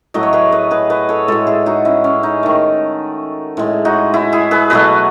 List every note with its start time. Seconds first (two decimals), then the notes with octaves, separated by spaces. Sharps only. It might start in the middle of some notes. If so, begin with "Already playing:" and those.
0.14 A2 F#3 A3 D#5
0.23 C#5
0.33 G#4 B4
0.52 B4 D#5
0.71 G#4 B4
0.90 B4 D#5
1.09 A4 C#5
1.28 A2 G#3 F#4 A4
1.47 E4 G#4
1.66 D#4 F#4
1.85 C#4 E4
2.04 C#4
2.23 D#4
2.43 D#3 A3
3.57 A2 G#3
3.85 D#4 F#4
4.14 E4 G#4
4.32 E4 G#4
4.51 G#4 B4
4.70 B2 F#3 A3 B4 D#5